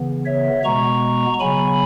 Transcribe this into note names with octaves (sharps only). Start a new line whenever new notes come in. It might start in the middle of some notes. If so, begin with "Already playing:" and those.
Already playing: C#3 E3 B3
C#5 E5
B2 G#3 B3 A#5 C#6
C#3 F#3 B3 G#5 B5